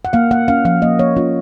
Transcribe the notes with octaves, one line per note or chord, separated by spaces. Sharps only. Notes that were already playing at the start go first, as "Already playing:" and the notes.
F#5
A#3 F5
A#3 F#5
C#4 F5
F3 F5
A#3 D#5
A#3 C#5
C#4 F4